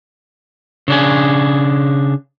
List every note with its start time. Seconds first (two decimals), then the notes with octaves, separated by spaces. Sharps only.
0.88 C#3 D4 G#4